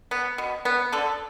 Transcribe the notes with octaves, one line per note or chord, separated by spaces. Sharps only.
B3
B2
B3
D3 A4